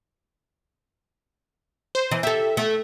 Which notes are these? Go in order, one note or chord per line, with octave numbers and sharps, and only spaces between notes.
C5
E3
G4 A4 E5
A3